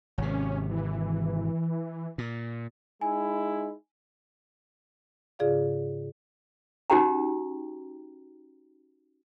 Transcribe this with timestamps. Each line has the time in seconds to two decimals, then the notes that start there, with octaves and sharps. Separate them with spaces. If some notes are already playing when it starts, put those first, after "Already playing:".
0.18 G#1 C3 C#4
0.71 E3
2.18 A#2
3.01 G#3 D#4 E4 G#5
5.39 G#2 C#3 F4 G#4 D5 F5
6.90 C#4 D#4 F#4 G4 G5 A#5